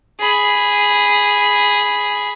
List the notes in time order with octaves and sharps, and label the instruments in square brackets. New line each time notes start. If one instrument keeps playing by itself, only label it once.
[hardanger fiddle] G#4 B5